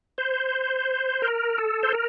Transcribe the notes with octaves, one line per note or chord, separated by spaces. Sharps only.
C5
A#4
A4
C5
A#4